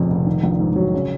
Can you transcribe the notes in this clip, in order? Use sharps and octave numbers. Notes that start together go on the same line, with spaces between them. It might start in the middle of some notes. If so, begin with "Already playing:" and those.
Already playing: F1 F2 A#2 C#3
F1
D#3
A#1
G#2
F#3
C#3